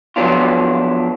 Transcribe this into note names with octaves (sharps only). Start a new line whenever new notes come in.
F3 F#3 B3 D4 F4